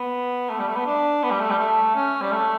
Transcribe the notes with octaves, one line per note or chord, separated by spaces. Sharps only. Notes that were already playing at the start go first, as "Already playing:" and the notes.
Already playing: B3
A3
G3
A3
B3
D4
B3
G3
A3
G3
A3
C#4
G3
A3